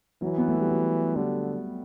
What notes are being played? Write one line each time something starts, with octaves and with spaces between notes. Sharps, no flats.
E3 F#3
B3
A3
G3
F#3
D3 G3